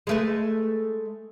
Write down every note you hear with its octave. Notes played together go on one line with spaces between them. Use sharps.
G#3 A3 B4